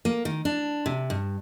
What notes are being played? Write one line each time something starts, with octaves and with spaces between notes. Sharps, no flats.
A#3
D#3
D4
C3
G2